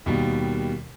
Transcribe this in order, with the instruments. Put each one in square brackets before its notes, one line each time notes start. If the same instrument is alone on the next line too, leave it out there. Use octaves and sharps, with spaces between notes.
[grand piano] D#2 B2 D#3 G3